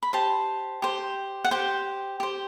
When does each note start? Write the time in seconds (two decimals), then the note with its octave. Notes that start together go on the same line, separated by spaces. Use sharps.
0.03 B5
0.13 G4 C5 A5
0.82 G4 C5
1.45 F#5
1.51 G4 C5 G5
2.20 G4 C5